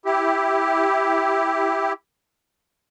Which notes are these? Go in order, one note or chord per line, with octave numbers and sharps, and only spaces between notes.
E4 G4